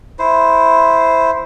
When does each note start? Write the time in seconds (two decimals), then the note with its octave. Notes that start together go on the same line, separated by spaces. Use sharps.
0.19 E4 C5